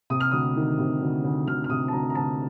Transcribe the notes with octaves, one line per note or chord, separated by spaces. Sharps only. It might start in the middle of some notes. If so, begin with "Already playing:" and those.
C3 D#6
F6
D2 D#6
D#3
C3
D2
D2
D2 F6
F6
C3 D#6
A5
D2 A#5
A#5
D2 A5